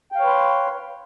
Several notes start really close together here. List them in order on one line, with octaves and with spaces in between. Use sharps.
G5 F5 C#5 B4 C6